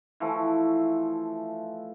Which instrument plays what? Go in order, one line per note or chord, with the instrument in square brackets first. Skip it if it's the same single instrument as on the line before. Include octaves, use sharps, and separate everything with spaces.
[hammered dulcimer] E3 F3 A3